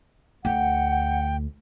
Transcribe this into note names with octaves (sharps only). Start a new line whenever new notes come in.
D2 F#5 G5